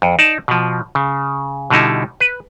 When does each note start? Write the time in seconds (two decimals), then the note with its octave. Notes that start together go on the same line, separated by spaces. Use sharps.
0.02 F2
0.19 D#4 D5 A5
0.48 B2 F3
0.95 C#3
1.70 B2 D3 G3 D#4 E4
2.20 B4